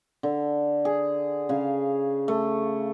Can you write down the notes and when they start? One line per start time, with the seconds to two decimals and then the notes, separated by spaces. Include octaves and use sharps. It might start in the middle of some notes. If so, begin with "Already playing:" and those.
0.23 D3
0.85 G#4
1.49 C#3 F5
2.28 A3